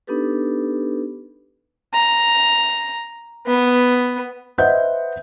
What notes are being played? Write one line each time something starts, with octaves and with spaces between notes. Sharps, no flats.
B3 D4 D#4 G4 A4 B4
A#5
B3
B4 C5 D#5 E5 F#5 G6